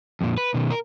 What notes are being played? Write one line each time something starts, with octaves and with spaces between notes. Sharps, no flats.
F2 A#2
B4
B2 D#3
A#4